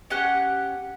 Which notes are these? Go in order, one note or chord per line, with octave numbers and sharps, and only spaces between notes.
C#4 G4 F#5